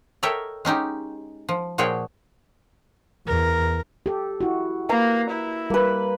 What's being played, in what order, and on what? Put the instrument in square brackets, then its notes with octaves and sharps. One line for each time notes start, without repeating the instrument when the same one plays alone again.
[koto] A4 A#4 C#5 D#5 E5 G5
G#3 C#4 D#4 G4
F3
A#2 F3 F#4 G#4 C#5 G5
[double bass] E2 [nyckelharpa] A#4
[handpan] G4 A4
E4 F#4
[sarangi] A#3 [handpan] B4 [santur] A#5
[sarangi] E4
[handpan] G3 [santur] A#3 B4